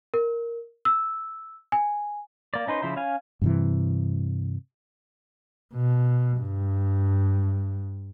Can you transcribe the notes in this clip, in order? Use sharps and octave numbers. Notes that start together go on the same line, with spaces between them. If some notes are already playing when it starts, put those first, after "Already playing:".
A#4
E6
G#5
A#3 D5
C#4 D#4 B4 C5
C#3 F3 E4 C5
C#4 F5 G#5
G2 C3 E3
B2
G2